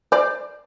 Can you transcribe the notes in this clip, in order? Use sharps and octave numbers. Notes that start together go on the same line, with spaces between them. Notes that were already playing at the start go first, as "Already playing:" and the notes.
C5 D5